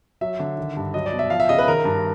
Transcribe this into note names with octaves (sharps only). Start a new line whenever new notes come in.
F#3 E5
D3
D#3
G2
F#3 D#5
D5
B2
E5
F3 F5
E5
C#3 D#5
B4
D#3 A#4
G2